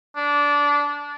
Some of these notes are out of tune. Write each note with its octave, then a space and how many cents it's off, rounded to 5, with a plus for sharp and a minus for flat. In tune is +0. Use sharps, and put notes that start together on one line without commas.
D4 -20